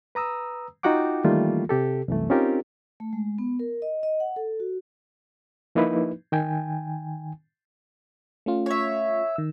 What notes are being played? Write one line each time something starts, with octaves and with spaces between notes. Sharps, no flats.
B4 A#5 D#6 E6
D#4 F4 F#4 F#5 G5 D6
D#3 E3 G3 A3 A#3 F4
C3 G4 A4
C2 F#2 E3 A3
C4 C#4 D#4 F4 G4 A#4
A3
G#3
B3
A#4
D#5
D#5
F#5
A4
F#4
F3 A#3 D#4 E4 B4
D#3 G5 G#5
A3 C#4 F4
C#5 E5
D#3 E6